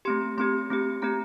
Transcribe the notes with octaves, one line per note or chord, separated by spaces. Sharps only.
A3 C4 G4 C6
A3 C4 G4 C6
A3 C4 G4
A3 C4 G4 A#5